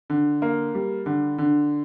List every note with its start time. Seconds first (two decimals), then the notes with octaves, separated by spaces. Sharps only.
0.10 D3
0.42 A#3
0.75 G3
1.06 D3
1.38 D3